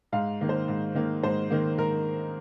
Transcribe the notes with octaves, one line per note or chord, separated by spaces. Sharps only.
G#2 F5
D#3 A#3
C5
G#2
D#3 A#3
G#2 C5
D#3 A#3
G#2 A#4